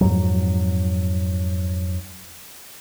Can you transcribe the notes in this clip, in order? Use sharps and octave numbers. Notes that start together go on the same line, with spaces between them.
F2 G#2 F#3